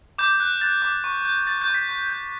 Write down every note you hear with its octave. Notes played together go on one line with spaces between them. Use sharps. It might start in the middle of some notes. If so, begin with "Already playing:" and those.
D6 G6
F#6
F#6 A6
D6
C#6
G6
G6 A6
G6
C#6
B6
C#6
G6